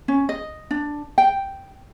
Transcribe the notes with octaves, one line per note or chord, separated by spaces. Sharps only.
C#4
D#5
D4
G5